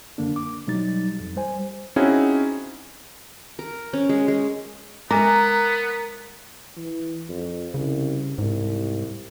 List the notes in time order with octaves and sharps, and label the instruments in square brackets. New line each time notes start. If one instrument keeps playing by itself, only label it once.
[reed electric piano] F#2 D3 A#3 D4
D6
B2 F#3 G3 D#4 A6
F2
G3 C5 G#5
[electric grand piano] C4 C#4 D#4 E4 F#4 G#4
[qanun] A#4
C#4
G#3
G#3
[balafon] G#3 G#5 D6 [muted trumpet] B3 [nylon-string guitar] A#4 [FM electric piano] A#5
[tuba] E3
F2
[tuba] C2 [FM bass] C#3
[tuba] C2 [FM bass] G#2